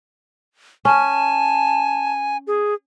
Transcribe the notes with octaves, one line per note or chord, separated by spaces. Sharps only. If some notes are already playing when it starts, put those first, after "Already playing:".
C#4 G#5 A5
G#4